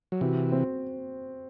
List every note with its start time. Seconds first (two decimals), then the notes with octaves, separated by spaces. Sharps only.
0.12 F#3
0.21 C3 E3 F#4
0.52 C4